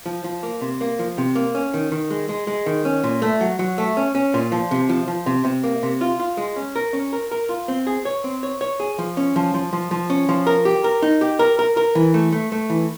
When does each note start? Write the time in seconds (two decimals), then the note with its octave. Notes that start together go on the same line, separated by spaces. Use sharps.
0.06 F3
0.24 F3
0.43 A#3
0.61 C3
0.81 A#3
0.99 F3
1.18 C3
1.35 A#3
1.55 C#4
1.74 D#3
1.92 D#3
2.10 G#3
2.29 G#3
2.47 G#3
2.66 D#3
2.85 C#4
3.04 A#2
3.22 A3
3.41 F#3
3.59 F#3
3.78 A3
3.97 C#4
4.15 C#4
4.34 A#2
4.52 F3
4.71 C3
4.89 F3
5.08 F3
5.26 C3
5.45 C3
5.64 A#3
5.83 C3
6.01 F4
6.20 F4
6.37 G#3
6.56 C#4
6.76 A#4
6.93 C#4
7.13 A#4
7.31 A#4
7.49 F4
7.68 C4
7.87 G#4
8.05 C#5
8.24 C4
8.43 C#5
8.61 C#5
8.80 G#4
8.98 F3
9.17 C#4
9.36 F3
9.54 F3
9.73 F3
9.91 F3
10.10 C#4
10.29 F3
10.47 A#4
10.65 G4
10.84 A#4
11.02 D#4
11.21 G4
11.39 A#4
11.59 A#4
11.77 A#4
11.95 E3
12.14 A3
12.32 A3
12.52 A3
12.70 E3